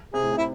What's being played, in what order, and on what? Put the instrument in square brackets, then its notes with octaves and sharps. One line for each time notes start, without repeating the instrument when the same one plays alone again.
[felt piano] C3 [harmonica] G#4
[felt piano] A2
C3
[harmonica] E4